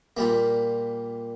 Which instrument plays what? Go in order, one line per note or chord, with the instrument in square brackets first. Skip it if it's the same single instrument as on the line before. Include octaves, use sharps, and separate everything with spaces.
[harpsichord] A#2 G3 A#3